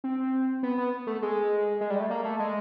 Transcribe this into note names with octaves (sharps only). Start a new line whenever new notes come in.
C4
B3
B3
A3
G#3
G#3
G3
A3
A#3
A3
G#3